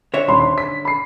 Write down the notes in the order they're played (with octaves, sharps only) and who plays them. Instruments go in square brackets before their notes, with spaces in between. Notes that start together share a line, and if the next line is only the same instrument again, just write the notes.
[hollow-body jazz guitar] D3 C#5 E5
[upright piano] D#1 B5 C6
C6
B6
B5 C7